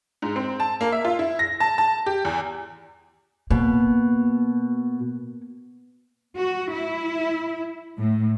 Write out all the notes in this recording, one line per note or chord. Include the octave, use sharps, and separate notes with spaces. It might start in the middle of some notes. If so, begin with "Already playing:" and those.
G#2
C4
A5
A#3
E5
F4
E4
A#6
A5
A5
G4
E2
B2 A#3
F#4
E4
A2